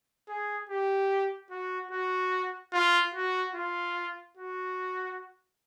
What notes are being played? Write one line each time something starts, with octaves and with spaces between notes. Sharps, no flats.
G#4
G4
F#4
F#4
F4
F#4
F4
F#4